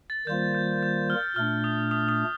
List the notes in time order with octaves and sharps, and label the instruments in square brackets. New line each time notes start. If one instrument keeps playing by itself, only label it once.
[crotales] A6
[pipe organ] D#3 G3 A#3 F4 C5 [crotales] G6
[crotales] G6
G6
F6
[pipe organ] A#2 A3 D4 [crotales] F6
[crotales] D#6
D#6
D#6